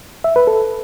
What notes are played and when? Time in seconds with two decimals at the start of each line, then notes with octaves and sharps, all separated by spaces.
0.24 E5
0.36 B4
0.47 A4